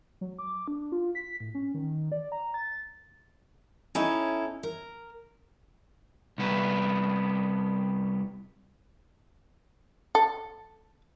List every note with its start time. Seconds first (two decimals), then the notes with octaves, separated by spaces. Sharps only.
0.21 F#3
0.39 D6
0.68 D4
0.92 F4
1.15 B6
1.40 A2
1.54 C#4
1.74 D#3
2.12 D5
2.32 A#5
2.54 A6
3.95 C#4 D#4 E4 A4 C#5
4.63 A#4
6.38 C2 B3
10.15 A4